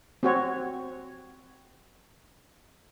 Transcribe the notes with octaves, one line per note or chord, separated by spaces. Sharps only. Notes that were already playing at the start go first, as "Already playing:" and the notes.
C4 F#4 C#5